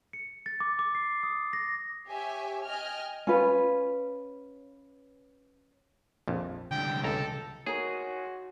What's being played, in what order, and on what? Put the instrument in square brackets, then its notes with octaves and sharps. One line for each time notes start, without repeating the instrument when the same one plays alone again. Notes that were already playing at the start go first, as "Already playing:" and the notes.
[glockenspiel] C#7
A6
D6
D6
C7
D#6
A#6
[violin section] G4 C#5 E5 G#5
D#5 G5 G#5 F6
[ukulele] C#4 F4 B4
[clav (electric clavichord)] A#1 F2
[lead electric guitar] C2 D3 [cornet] G5
[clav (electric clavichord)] C#2 A#5 [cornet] A4
[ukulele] D#4 A#4 [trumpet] F#4 [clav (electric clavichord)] G#4 [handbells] C#5 G#5